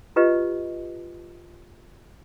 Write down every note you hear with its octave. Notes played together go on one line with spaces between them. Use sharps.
F4 G4 B4 D#5